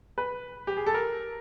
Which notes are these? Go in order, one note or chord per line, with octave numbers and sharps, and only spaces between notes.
B4
G4
G#4
A4
A#4